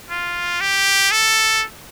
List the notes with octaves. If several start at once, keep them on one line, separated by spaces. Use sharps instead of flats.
F4
G4
A4